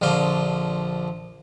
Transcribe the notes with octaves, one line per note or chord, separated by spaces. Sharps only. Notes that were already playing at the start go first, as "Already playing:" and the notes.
A#1 D3 F3 F5 C6